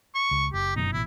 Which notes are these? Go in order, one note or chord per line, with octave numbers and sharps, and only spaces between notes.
C#6
C#2
F#1 G4
G1 F#2 B2 D#4
A1 B2 E4